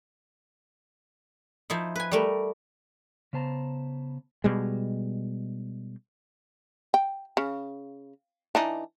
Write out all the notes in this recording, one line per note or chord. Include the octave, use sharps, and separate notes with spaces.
F3 D#4 E4
B4 G#5
G3 A3 A#4
C#3 B3 C5 A5 A#5
B2 G3 G#3
G5
C#3
E3 D4 D#4